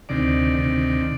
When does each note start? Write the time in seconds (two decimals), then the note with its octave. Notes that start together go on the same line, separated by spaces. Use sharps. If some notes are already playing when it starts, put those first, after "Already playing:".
0.09 D2 C3 D#3 D5
0.57 D2 C3 D#3